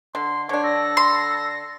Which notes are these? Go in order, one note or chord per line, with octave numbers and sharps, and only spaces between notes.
D3 C6
D3 D4 C#5
A4 A#6
C6